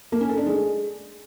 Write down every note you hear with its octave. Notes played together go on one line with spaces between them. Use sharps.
A#3
C#4
A4
D4
G#3